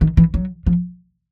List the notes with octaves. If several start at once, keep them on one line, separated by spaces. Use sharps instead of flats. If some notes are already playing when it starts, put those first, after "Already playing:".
D#3
E3
F#3
F3